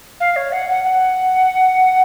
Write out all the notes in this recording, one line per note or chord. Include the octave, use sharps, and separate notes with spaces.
F5
C#5
F#5
F#5
F#5